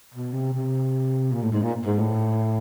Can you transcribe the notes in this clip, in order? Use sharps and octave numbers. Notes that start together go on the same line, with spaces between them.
B2
C3
C3
A#2
A2
G#2
A#2
G#2
A2